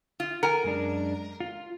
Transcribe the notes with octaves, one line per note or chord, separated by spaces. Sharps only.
F4
A#4 F#5 G#5
F#2 G#3 D4
F4